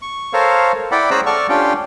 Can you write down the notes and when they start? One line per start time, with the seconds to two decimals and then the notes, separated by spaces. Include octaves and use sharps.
0.02 C#6
0.33 A4 A#4 C5 C#5 F5
0.92 E4 D5 F#5 G5 B5 D6
1.11 C#4 G#4 C5 A#5 E6 F#6
1.26 A4 D5 F#5 A5 C#6 F6
1.49 C#4 D4 F4 G4 F5 G5